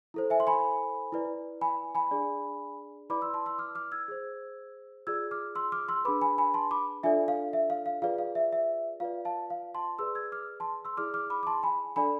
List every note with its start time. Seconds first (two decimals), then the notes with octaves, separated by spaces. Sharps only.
0.14 E4 A4 C5
0.30 E5 G#5
0.40 C6
0.47 G#5 B5
1.12 E4 B4 D5
1.61 G#5 B5
1.95 G#5 B5
2.11 D4 G#4 D5
3.10 E4 B4 D5 B5 D6
3.22 C6 E6
3.34 A5 C6
3.46 C6 E6
3.58 D6 F6
3.75 D6 F6
3.92 E6 G#6
4.08 G#4 C5
5.07 F4 G#4 D5 E6 G#6
5.31 D6 F6
5.55 C6 E6
5.72 D6 F6
5.89 C6 E6
6.05 D4 G#4 B4 B5 D6
6.21 G#5 B5
6.38 G#5 B5
6.54 A5 C6
6.71 B5 D6
7.03 D4 F4 A4 D5 E5 G#5
7.28 F5
7.53 E5
7.70 F5
7.86 F5
8.02 F4 G#4 B4 D5 F5
8.18 F5
8.35 E5
8.53 E5
9.00 F4 B4 D5 F5
9.25 F5 A5
9.50 F5
9.75 A5 C6
9.98 G#4 B4 D5 C6 E6
10.15 E6 G#6
10.32 D6 F6
10.60 A5 C6
10.85 C6 E6
10.97 E4 G#4 D5 D6 F6
11.14 D6 F6
11.30 B5 D6
11.43 D6
11.47 A5 C6
11.63 G#5 B5
11.96 D4 A4 D5 G#5 B5